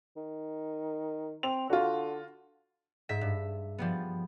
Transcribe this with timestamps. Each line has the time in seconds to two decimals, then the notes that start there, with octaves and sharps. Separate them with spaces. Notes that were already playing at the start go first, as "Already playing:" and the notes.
0.17 D#3
1.43 C4 F7
1.70 D3 F4 F#4
3.09 G#2 E5 B6
3.21 G2
3.78 F3 G3 B3